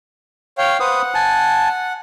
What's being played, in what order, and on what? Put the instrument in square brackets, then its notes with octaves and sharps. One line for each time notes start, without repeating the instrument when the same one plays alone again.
[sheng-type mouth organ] C#5 F5 G5
[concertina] B4 C5 D#6 [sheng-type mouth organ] F#5
[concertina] G#5 A5